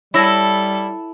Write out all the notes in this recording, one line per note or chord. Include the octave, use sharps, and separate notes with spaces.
G3 E4 A4 C#5 E6 A#6